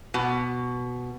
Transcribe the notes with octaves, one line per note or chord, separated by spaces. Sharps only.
B2